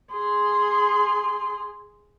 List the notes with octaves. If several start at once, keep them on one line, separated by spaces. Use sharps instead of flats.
G#4 C6